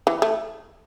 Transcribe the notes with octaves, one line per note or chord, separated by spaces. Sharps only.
E3
A3